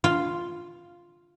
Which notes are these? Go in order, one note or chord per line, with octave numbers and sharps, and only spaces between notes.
F4